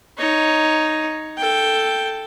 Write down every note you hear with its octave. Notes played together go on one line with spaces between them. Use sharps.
D#4 C#5
A4 G5